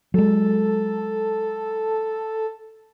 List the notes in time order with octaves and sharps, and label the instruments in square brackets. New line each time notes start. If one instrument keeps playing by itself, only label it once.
[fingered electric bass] F#3 G#3 [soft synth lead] A4